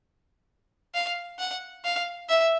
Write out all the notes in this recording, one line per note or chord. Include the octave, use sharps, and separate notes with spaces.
F5
F#5
F5
E5